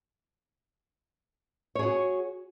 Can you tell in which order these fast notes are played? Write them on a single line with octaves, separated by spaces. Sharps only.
C#5 G#4 F#4